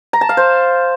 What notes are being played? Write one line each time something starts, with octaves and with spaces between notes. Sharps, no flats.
A#5
A5
F5
C5